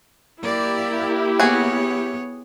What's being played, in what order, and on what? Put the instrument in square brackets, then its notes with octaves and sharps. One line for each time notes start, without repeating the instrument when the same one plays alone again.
[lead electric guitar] A#3 [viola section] E4 G4 [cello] D5
[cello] B3 C#5 [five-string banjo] F#4 G#4